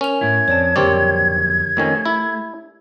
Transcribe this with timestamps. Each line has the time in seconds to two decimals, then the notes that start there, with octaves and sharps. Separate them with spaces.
0.01 C#4 A#4 F7
0.21 A2 E4 G#6
0.48 F2 C4 C#5 D5 A5
0.76 F2 D3 F#3 C4 G4 A#4 C#5 D5
1.77 F2 D#3 A3 C#4
2.06 E4